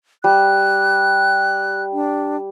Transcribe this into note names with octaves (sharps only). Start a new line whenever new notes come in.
G3 F#6
D4